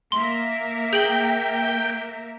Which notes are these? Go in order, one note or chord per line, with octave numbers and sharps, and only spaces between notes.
A#3 A#4 E5 C6
G#4 G5 D7 F#7